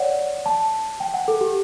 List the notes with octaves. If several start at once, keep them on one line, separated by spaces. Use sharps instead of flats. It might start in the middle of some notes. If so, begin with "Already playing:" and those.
Already playing: C#5 D5 F#5
A5
G5
F#5
A4
G4